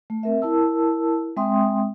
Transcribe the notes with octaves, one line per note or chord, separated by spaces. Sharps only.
A3
C4 A#4 E5
E4 A#4 A5 E6
G#3 C4 E5 G5 C6 D#6